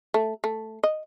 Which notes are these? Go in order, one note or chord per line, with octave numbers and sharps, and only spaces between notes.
A3
A3
D#5